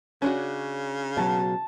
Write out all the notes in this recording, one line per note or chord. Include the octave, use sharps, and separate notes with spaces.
C#3 C#4 D4 F#4
B2 F#3 A5